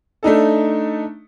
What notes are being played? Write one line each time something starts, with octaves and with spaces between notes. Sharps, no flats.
A3 D4 D#4 A4